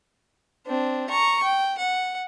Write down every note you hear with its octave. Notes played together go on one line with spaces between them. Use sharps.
C4 D4
A#5 C#6
G5
F#5